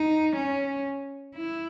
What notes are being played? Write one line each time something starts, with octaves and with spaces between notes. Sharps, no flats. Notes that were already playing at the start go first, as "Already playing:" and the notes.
Already playing: D#4
C#4
E4